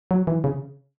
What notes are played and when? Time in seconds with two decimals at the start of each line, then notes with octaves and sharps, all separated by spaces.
0.11 F#3
0.27 E3
0.44 C#3